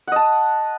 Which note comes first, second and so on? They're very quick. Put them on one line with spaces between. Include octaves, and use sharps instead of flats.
F#5 D#5 A5